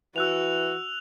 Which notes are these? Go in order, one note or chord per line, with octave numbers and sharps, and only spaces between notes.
E3 F#4 E6 F#6 F7